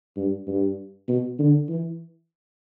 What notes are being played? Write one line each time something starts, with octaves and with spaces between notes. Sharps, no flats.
G2
G2
B2
D3
E3